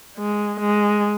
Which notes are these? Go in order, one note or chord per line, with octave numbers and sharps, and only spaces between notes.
G#3
G#3